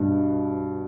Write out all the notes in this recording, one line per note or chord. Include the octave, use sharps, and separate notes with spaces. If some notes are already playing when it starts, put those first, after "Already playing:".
Already playing: G2 B2